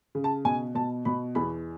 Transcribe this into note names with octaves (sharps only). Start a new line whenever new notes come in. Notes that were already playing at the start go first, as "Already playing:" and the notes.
C#3
A5
B2 G#5
B2 A5
B2 B5
E2 B5